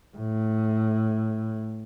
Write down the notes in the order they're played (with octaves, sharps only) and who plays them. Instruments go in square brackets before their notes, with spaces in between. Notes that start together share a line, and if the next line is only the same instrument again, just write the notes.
[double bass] A2